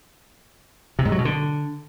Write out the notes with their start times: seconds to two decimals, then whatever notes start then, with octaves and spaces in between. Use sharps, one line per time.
0.99 C3
1.05 G#2
1.12 F#3
1.18 B2
1.25 D3